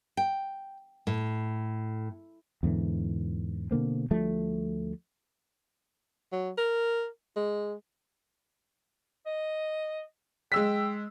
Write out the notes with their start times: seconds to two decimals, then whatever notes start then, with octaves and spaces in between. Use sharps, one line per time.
0.17 G5
1.07 A2
2.63 E2 G#2 D3 E3
3.71 B2 D3 A#3 C4
4.11 D2 F3 G3 A3
6.32 F#3
6.57 A#4
7.36 G#3
9.26 D#5
10.52 G#3 G5 E6 B6